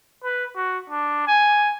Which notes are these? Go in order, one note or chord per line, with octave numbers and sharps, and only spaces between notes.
B4
F#4
D4
G#5